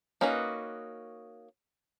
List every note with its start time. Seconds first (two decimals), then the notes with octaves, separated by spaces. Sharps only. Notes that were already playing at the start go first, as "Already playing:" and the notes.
0.21 A#3 C#4 D#4 F#4 B4